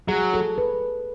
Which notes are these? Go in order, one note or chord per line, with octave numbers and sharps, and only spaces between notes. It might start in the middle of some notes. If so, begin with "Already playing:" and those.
F#3 G#4
A4
B4